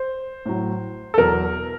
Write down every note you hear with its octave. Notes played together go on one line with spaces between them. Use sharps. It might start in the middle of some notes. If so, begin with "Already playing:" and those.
Already playing: C5
A2 F#3
A4
E2 B2 F#3 A#4